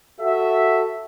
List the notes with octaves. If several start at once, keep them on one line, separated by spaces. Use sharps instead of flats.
F#4 A4 E5